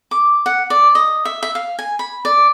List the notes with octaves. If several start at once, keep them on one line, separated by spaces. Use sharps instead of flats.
D6
F#5
D5
D#5
E5
E5
F5
G#5
B5
D5